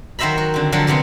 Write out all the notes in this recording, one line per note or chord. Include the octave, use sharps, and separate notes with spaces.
D#3 F#3 C5 E5 A#5 B5
F#4
D3 C4
D3 F3 F#3
C3 F#3 B3 C4